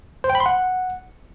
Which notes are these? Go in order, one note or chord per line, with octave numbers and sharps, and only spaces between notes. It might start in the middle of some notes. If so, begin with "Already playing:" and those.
C5
G5
B5
C6
F#5